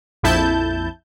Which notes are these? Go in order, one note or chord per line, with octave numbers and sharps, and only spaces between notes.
A#1 F2 E4 A5 G6